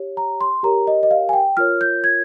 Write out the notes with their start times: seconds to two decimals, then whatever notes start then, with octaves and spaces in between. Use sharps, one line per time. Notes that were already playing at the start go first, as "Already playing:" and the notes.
Already playing: G4 C#5
0.17 A#5
0.41 C6
0.63 G4 A#4 C#5 A#5
0.87 D#5
1.03 D#5
1.11 F5
1.29 G#5
1.33 G5
1.57 F4 A#4 C#5 F6
1.81 G6
2.04 G#6